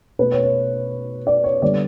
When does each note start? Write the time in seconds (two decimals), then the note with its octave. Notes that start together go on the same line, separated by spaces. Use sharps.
0.19 B2 A3 B4
0.32 C#5
0.43 C#5
1.27 D5
1.44 C#5
1.62 D3 G3 B3 D5